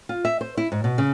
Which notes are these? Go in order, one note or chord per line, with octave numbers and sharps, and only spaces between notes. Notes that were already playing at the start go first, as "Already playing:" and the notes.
F4
E5
C5
E4
G#2
B2
C#3